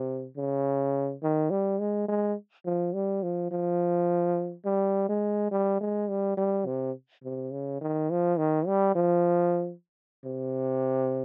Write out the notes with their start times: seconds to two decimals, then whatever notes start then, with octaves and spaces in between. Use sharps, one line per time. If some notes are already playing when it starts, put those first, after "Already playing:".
Already playing: C3
0.37 C#3
1.23 D#3
1.50 G3
1.79 G#3
2.08 G#3
2.65 F3
2.94 G3
3.23 F3
3.51 F3
4.65 G3
5.09 G#3
5.51 G3
5.81 G#3
6.10 G3
6.37 G3
6.66 C3
7.24 C3
7.52 C#3
7.81 D#3
8.10 F3
8.38 D#3
8.67 G3
8.95 F3
10.25 C3